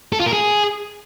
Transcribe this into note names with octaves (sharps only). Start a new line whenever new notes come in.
A4
F4
A#4
G#4